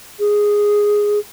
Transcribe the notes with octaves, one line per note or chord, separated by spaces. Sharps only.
G#4